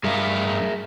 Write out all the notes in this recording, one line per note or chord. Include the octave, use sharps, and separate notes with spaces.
G2 G#4 A#4 E5 F5